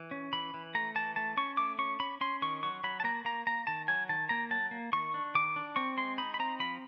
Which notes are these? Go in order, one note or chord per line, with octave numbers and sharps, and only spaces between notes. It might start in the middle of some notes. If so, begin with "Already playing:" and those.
Already playing: E3
C#4
E3 B5
E3
A3 A#5
E3 A5
A3 A5
C#4 C#6
A3 D6
C#4 C#6
C#4 B5
C#4 C6
D#3 C#6
F#3 C#6
F#3 B5
A5
A#3 A#5
A#3 A#5
A#3 A#5
D#3 A5
F#3 G#5
D#3 A5
A#3 A#5
F#3 A5
A#3
D#3 C#6
D4
D#3 D6
D4
C4 C#6
G#3 C6
D#4 B5
B5
C4 A#5
F3 B5